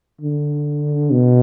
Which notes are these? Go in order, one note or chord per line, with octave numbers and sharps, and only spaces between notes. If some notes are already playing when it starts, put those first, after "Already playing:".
D3
B2